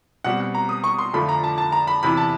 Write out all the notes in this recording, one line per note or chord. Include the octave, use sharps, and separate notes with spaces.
B2 G3 C4 F#5
F#5
A#5
D#6
C#6
C6
F2 D3 F3 A3 D4 B5
A#5
A5
A5
A#5
B5
E2 C3 E3 B5
A5